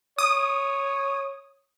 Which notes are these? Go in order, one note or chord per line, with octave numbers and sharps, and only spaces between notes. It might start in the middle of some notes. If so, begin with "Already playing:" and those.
C#5 D#6